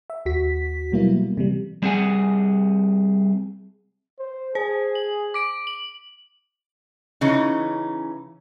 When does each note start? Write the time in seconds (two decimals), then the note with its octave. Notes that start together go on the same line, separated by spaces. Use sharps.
0.10 E5
0.26 D#2 F#4 B6
0.92 B2 F#3 G3 A#3 B3 E4
1.37 C3 E3 G3
1.82 G3 C4 G#4 F#5 G#5
4.19 C5
4.55 G#4 C5
4.95 F#7
5.34 D6 D7
5.67 F#7
7.21 C#3 E3 C#4 D#4